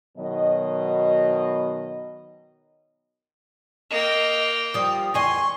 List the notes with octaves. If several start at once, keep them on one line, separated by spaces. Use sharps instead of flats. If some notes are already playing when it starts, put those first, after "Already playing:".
B2 D#3 F#3 D#5
A#3 D#5 G5
F3 G3 D#6
E2 G#4 D#5 C6 C#6